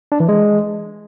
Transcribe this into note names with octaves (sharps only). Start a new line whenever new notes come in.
D4
E3
G#3